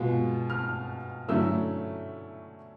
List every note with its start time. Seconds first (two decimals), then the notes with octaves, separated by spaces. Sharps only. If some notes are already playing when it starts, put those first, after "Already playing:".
Already playing: B2 G#3 B3 F4
0.50 F6
1.28 D3 F#3 A3 C#4 E4 E6